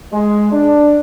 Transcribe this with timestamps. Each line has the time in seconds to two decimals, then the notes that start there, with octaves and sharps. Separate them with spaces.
0.12 G#3
0.53 D4